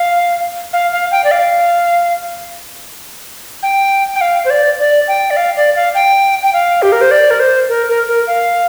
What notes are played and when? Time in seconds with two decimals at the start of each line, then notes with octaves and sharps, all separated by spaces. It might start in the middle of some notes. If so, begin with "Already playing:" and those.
Already playing: F5
0.73 F5
0.92 F5
1.12 G5
1.24 D5
1.31 F5
3.63 G5
4.16 G5
4.21 F5
4.45 C5
4.50 D5
4.80 D5
5.08 G5
5.30 D5
5.37 F5
5.56 D5
5.76 F5
5.95 G5
6.43 G5
6.53 F5
6.82 G4
6.92 A#4
7.01 C5
7.11 D5
7.31 A#4
7.40 C5
7.69 A#4
7.89 A#4
8.08 A#4
8.27 F5